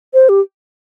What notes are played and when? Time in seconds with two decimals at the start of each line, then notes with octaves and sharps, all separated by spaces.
0.14 C5
0.29 G4